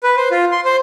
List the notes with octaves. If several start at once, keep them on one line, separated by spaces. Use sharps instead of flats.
B4
C5
F4
C6
C5